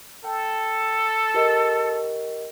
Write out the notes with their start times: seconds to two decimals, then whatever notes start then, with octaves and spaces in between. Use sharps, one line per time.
0.24 A4 G5
1.34 G4 A#4 D#5